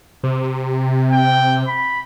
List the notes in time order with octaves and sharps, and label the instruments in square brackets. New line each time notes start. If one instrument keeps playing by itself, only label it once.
[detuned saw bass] C3
[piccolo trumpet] G5
B5